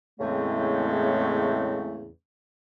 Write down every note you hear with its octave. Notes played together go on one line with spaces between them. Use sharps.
E2 A2 C#3 G#3 A3 C4